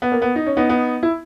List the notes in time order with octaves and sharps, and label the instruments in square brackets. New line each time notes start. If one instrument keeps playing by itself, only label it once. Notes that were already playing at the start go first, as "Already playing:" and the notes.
[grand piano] B3
A#3
B3
D#4
C#4
B3 D#4
B3 D#4
E4